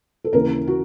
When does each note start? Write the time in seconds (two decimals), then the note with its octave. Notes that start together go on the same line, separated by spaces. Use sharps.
0.24 A4
0.33 D#2 C#3 E3 A#4
0.67 F#4